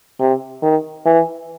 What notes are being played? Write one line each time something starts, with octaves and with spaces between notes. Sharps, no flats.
C3
D#3
E3